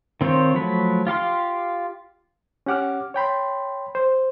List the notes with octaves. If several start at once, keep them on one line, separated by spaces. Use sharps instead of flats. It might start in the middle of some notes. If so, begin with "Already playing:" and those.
D#3 C4 F4 C5 C#5
F3 F#3 A3 B5
F4 G4 F5 C6
C#4 G4 F#5 D6 F6
C#5 G5 B5 C6
C5